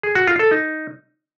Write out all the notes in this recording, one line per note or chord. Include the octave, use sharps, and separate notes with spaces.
G#4
F#4
F4
A4
D#4